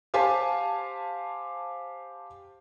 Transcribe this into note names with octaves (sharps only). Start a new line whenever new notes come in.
G4 C5 F5 G#5 A5